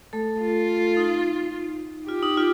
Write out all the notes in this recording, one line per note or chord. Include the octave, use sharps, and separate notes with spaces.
A3 A4
F4
D#4
F4 G4
D#4
F4